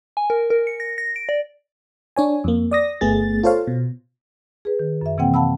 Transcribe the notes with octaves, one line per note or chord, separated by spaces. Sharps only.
G#5
A#4
A#4
C#7
A#6
A#6
D7
D5
D4 C#5 G#5
F2 A#3
D5 D#6 A#6
G1 A3 B3 G#4 A6
F4 A4 C5 C#5 F5
B2
G#4 B4
D#3
F#2 E5
C3 E3 A#3 C4 F#5 G5
F5 F#5 A5 B5 E6